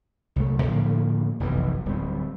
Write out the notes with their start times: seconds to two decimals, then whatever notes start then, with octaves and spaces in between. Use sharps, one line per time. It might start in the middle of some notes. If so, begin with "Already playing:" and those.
0.36 C2 F#3 A3
0.62 A2 D3 F3 A#3
1.40 F1 B1 F#2 E3
1.85 D1 G3 C4